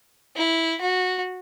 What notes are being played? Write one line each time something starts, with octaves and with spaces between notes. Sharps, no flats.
E4
F#4